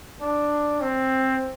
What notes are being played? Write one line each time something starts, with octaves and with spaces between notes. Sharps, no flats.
D4
C4